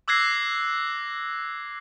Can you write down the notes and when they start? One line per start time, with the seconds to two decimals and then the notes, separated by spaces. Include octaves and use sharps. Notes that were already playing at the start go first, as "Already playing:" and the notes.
0.08 D6 E6 F#6 G#6 A#6 C7